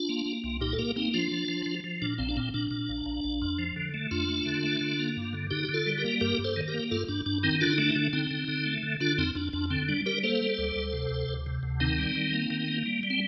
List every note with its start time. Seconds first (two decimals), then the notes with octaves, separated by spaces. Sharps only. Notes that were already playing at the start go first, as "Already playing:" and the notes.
Already playing: D4 F4
0.09 A#3
0.26 A#3
0.44 C2
0.61 A#2 D#4 G4
0.73 A4
0.79 A#3 G4 A#4
0.96 A#3 C4 D#4
1.14 F3 D4 F4
1.32 F3
1.48 F3
1.66 F3
1.84 F3
2.02 A#2 D4
2.18 A#1 C4
2.29 D4
2.37 A#2 C4
2.54 A#2 D4
2.71 A#2
2.89 A#1
3.06 A#1
3.24 A#1
3.42 F2
3.59 F3
3.76 D3
3.94 A3
4.11 F2 D4 F4
4.29 A3
4.46 D3
4.63 A3
4.81 D3
4.99 A#3
5.17 G2
5.33 D3
5.51 D3 D#4 G4
5.64 G4
5.69 D3
5.74 F4 A4
5.86 G3
5.98 G4 A#4
6.04 A#3
6.21 G2 G4 A#4
6.38 G2
6.44 A4 C5
6.56 D#3
6.68 G4 A#4
6.74 A#3
6.91 G2 F4 A4
7.08 G2 D4
7.26 G2 D4
7.43 D#3 C4 D#4
7.60 D3 D4 F4
7.70 D#4
7.78 A3 D4
7.89 D#4
7.95 D3 D4
8.13 D3 C4 D#4
8.31 D3
8.48 D3
8.66 A3
8.83 D3
9.00 D3 D4 F4
9.18 F2 C4 D#4
9.35 F2 D4
9.53 F2 D4
9.70 D3 C4
9.89 G3 D4
10.06 G3 G4 A#4
10.23 A#3 A4 C5
10.41 G3
10.58 D2
10.76 D2
10.93 C3
11.11 D2
11.29 D2
11.46 C3
11.63 D2
11.80 D#3 C4 D#4
11.98 G3
12.16 D#3
12.34 A#3
12.50 D#3
12.68 A#3
12.86 G3
13.03 G3
13.10 C4